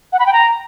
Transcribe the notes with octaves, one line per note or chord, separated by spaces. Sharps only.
F#5
B5
G5
A#5